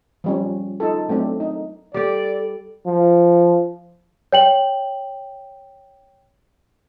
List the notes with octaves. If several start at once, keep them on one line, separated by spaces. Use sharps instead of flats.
F3 G3 C#4
D#4 F4 A4
F#3 A3 C4 D4
D#4
G3 G4 A4 D5
F3
C#5 G5 F#7